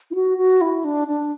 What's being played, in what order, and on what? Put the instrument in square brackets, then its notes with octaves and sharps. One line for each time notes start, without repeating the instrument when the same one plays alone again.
[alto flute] E4
F#4
F#4
E4
D4
D4